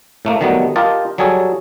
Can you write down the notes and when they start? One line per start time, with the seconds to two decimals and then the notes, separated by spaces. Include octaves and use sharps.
0.25 A2 A3 A#3
0.41 D#3 F#3 G3 A3 B3
0.76 F4 G4 A#4 D#5 A5
1.18 F#3 G3 G#4 A4 C#5